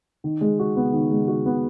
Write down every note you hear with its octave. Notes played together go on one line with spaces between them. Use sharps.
D#3
G#3
F#4
B3
D#3
G#3
F#4
B3